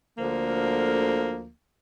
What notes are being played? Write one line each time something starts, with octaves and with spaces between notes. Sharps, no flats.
D2 D3 F3 A#3